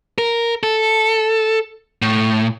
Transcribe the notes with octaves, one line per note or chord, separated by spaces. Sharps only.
A#4
A4
A2